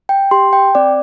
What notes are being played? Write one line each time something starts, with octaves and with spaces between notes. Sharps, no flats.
G5
G4 C6
G5
C4 D5